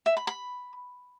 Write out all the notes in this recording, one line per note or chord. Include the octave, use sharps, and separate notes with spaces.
E5
B5
B5